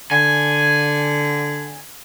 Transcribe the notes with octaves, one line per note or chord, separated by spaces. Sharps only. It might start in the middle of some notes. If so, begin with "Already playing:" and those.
D3 G#5